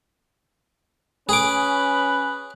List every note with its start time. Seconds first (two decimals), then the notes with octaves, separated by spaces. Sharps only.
1.29 C#4 G#4 B4 D6